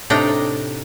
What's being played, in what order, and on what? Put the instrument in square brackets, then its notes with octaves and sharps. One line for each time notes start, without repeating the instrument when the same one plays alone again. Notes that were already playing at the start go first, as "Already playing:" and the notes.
[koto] A2 C3 D4 D#4 G5 A#5